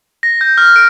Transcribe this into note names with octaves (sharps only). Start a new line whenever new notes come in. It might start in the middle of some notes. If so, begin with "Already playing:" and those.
A#6
G6
F6
D7